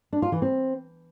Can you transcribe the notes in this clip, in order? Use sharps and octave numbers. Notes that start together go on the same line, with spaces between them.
D4
F4
E3
C4